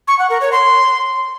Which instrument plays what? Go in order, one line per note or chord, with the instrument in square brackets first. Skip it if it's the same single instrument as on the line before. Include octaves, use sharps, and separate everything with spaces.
[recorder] C#6
F#5
A#4
C#5
C6